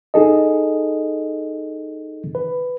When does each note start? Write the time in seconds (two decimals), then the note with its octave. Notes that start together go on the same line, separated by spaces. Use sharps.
0.14 D#4 G#4 A4 D#5
2.35 B4